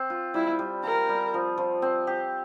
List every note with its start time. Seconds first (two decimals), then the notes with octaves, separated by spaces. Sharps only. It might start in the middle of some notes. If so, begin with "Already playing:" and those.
Already playing: C4
0.10 F4
0.34 G3 E4
0.59 G3
0.84 F4 A#4
1.09 G3
1.34 F3
1.58 F3
1.82 C4
2.07 G4